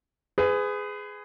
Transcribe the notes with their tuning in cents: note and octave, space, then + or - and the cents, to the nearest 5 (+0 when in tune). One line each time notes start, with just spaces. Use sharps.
G#4 +0 B4 +35